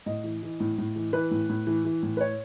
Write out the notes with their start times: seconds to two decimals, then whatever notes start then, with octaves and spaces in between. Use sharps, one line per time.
0.06 A2 D#5
0.24 E3
0.43 E3
0.60 A2
0.78 A2
0.96 E3
1.13 E3 B4
1.31 A2
1.50 A2
1.67 E3
1.85 E3
2.03 A2
2.17 B4
2.21 C#5